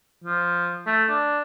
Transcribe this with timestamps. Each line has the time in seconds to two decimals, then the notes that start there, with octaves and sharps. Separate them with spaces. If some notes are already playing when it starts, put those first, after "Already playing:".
0.24 F3
0.87 A3
1.09 D4